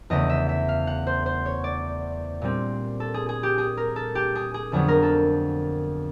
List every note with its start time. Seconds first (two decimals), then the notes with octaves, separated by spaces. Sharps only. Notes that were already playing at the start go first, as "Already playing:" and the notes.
0.10 E2 C#3 E3 A3 D#5
0.29 E5
0.49 E5
0.69 F5
0.87 F#5
1.07 C5
1.26 C5
1.46 C#5
1.64 D5
2.42 A#2 G3 C4
3.00 A4
3.14 G#4
3.29 G#4
3.43 G4
3.58 G#4
3.77 A#4
3.96 A4
4.15 G4
4.35 G#4
4.54 G#4
4.72 F2 D3 F#3 B3 G#4
4.88 A#4
5.03 A4